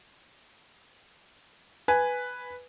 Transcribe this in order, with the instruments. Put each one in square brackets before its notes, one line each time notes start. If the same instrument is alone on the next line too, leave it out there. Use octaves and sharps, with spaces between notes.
[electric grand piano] B4 [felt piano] G#5